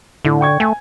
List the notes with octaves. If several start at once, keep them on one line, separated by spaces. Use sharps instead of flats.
A2 D3
G5 C#6 G#6
A3 G#5